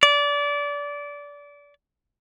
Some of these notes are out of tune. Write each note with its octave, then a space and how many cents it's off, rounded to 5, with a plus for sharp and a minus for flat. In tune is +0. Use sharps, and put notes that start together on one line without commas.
D5 -25